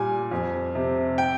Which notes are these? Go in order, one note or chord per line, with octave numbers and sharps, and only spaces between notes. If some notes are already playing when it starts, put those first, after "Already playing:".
Already playing: A#2 G3 G#5
F2
C3
G5